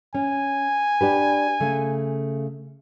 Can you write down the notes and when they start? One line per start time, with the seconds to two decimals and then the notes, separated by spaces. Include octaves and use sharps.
0.15 C#4 G#5
1.01 D4 G4 B4
1.60 C#3 A3